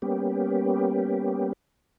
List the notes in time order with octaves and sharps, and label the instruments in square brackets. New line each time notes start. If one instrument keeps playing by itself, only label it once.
[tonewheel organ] G3 A#3 B3 C#4 G4